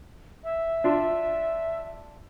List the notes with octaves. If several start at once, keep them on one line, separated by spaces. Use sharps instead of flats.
E5
D4 F4